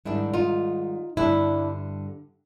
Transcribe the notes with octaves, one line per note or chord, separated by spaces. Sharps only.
G#2 D#3 G3 D4 E4
D#4 F4
G2 D3 G3 D4 E4